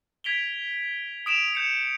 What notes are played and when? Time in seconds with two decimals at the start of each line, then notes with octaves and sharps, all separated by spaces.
0.24 G#6 B6 D7 F7 G7
1.26 D#6 D7 E7 F7
1.55 G6 C#7